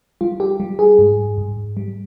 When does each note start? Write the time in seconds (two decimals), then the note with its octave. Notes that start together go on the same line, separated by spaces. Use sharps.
0.21 G3 F4
0.40 G4
0.60 G3
0.79 G#4
0.99 G#2
1.38 G#2
1.77 G3